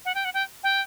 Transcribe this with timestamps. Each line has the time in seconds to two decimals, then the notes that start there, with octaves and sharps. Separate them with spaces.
0.05 F#5
0.15 G5
0.25 F#5
0.34 G5
0.63 G5